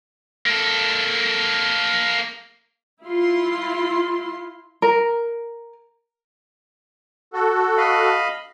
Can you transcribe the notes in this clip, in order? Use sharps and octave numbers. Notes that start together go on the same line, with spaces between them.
A#3 A4
E4 F4 C6
A#4
F#4 A4
D#5 F5 B5